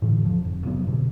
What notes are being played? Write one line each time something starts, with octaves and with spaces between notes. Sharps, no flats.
A2 D3 E3
E1 F3
F1
C3 F3 F#3 B3
F1 B2 D3